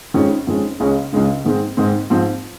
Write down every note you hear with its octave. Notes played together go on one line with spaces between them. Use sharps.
F2 D#3 G#3 C#4
F2 D#3 G#3 C#4
C#2 C#3 G#3 C#4
C#2 C#3 G#3 C#4
G#2 D#3 G#3 C4
G#2 D#3 G#3 C4
G#2 F3 C4